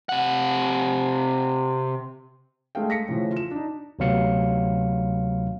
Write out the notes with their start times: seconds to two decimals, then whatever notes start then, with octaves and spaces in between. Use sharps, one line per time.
0.09 C3 F#5
2.75 G#3 A3 A4 F5 G5
2.90 A#6 B6 C#7
3.08 A2 C#3 E3 F3
3.32 F4 E7
3.51 D4 D#4
3.99 D2 C3 F#3 B3 F5 C#7